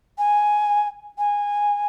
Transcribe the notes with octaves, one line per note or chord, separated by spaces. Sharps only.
G#5
G#5